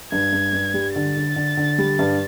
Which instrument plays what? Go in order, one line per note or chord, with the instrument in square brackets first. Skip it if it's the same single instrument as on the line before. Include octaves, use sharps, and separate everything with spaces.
[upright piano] G2 [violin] G#6
[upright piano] G2
G2
G3
[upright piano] D3 [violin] A6
[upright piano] D3
D3
D3
G3
G2